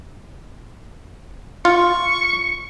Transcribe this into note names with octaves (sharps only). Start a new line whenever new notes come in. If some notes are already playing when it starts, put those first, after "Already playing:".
F4 C#6